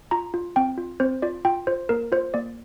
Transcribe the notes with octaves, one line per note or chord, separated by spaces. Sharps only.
F4 A#5
F4
C4 G5
F4
C4 C5
F4 D5
F4 G5
F4 C5
A#3 A#4
F4 C5
A#3 D5